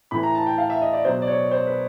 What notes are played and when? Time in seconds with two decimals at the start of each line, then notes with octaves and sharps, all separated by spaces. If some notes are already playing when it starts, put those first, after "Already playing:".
0.11 A2 E3 B5
0.23 A#5
0.35 A5
0.46 G5
0.58 F5
0.70 E5
0.81 D#5
0.93 D5
1.04 B2 F#3 C5
1.22 D5
1.28 C#5
1.51 C5
1.67 B4